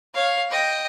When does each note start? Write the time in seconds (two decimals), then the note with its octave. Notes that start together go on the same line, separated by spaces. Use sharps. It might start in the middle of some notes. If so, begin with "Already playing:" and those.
0.14 C#5 F5
0.50 D#5 G5